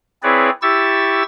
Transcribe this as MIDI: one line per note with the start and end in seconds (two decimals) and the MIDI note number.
0.23 0.50 60
0.23 0.50 64
0.23 0.50 68
0.23 0.50 71
0.23 0.50 73
0.23 0.50 74
0.62 1.23 64
0.62 1.23 67
0.62 1.23 85
0.62 1.23 88
0.62 1.23 93